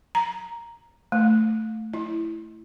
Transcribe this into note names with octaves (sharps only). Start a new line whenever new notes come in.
A#5
A3
E4